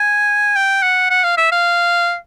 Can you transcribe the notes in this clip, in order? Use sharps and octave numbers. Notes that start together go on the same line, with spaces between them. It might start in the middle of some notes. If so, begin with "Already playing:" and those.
Already playing: G#5
G5
F#5
F#5
F5
E5
F5